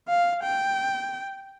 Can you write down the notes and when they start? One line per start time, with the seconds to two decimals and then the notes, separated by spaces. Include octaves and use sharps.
0.08 F5
0.43 G5